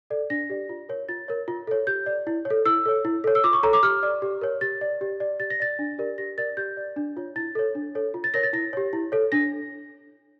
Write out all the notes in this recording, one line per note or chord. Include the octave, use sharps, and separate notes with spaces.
A4 D5
D4 A#6
G4 D5
F4
A#4 C#5
F4 A6
A#4 C#5
F4
A4 C#5
G4 G6
D5
E4
C#5
A4
E4 E6
A4 C#5
E4
A4 C#5
E6
F4 D6
C#6
A4 C#5 A#5
D6
G4 F6
D5
G4
A#4 C#5
G4 A6
D5
G4
D5
G4 A6
A#6
D5 A6
D4
G4 A#4 D5
G4 A#6
A#4 D5 A6
G4 G6
D5
D4
F4 C#5
E4 A6
A4 C#5
D4
A4 C#5
F4
A6
A#4 C#5 A#6
A6
E4 A#6
G4 C#5
E4
A4 C#5
D4 A#6